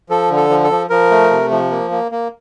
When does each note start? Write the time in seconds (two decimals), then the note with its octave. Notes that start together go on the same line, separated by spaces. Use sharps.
0.10 F3 A4
0.30 D3
0.37 A4
0.50 F3
0.64 A4
0.70 F3
0.90 F3 A#4
1.11 A3
1.31 C3
1.51 F3
1.71 A#3
1.91 A#3
2.12 A#3